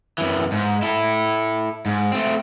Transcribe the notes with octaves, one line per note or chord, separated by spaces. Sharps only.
F#2 E3
G#2
E4 A4
G#2
A3 C4